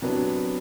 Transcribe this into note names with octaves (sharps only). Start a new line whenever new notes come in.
C3 F#3 B3 D4